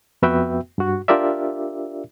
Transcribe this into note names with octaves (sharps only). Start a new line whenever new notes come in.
F2 B3 F#4 B4 E5 G5
G2 F#4
D4 F4 G4 A#4 D5 E5